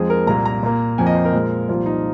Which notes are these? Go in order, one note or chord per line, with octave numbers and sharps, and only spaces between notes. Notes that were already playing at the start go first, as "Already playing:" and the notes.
Already playing: F2 F3 G#3 G#4
A#4
C2 A#2 A#3 A#5
A#5
A#2 A#3
F2 F3 A#3 G#5
D#5
C5
A#4
A#2 F3 G#3
C2 A#2 F3 A#3 F4
D#4